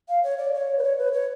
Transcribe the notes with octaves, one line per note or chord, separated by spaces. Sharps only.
F5
C#5
D5
C#5
B4
C#5
B4
C#5